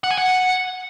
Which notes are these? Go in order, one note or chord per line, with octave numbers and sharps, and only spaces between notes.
F#5
G#5
F#5